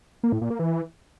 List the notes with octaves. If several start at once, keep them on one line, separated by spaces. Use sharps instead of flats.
A#3
A2
A#2
A#3
E3